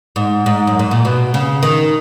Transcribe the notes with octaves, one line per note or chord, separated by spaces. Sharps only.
G#2
G#2
F#2
G#2
A#2
B2
C#3
D#3